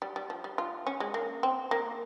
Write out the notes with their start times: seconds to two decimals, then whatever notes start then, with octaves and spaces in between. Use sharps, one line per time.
0.02 G3
0.16 G3
0.30 F3
0.44 G3
0.58 F4
0.87 C#4
1.00 G#3
1.14 A#3
1.43 C4
1.71 A#3